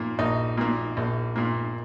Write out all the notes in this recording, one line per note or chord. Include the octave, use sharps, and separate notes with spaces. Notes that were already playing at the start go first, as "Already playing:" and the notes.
Already playing: A#2 A#3
A#1 D#4
A#2 A#3
A#1
A#2 A#3